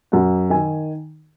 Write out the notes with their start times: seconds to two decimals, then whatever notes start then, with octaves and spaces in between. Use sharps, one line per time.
0.12 F#2 F#5
0.50 D#3 G#5